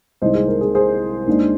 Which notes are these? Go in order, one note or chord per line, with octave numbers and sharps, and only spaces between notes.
C2 C3 D#3 G#3 D#4 C5 D#5
G#4 C5
A#4
G#4
G#4 C5
D#2 D#3 G#3 D4